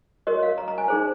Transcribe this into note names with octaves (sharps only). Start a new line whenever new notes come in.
F#4 A#4 C#5 D#5
F5
A#5
A#5
G#5
D#4 G#4 C5